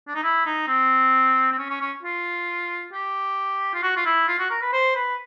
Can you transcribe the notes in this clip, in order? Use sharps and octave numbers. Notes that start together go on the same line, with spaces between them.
D4
D#4
E4
D#4
C4
C4
C#4
C#4
C#4
F4
G4
F4
F#4
F4
E4
F4
F#4
A#4
B4
C5
B4